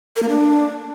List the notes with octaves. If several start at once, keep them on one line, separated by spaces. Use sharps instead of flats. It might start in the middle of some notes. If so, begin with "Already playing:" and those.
A#4
A#3
D4